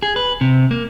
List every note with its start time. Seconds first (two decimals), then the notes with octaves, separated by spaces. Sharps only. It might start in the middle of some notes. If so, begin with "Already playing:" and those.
0.02 G#4
0.16 B4
0.41 C3
0.71 A#3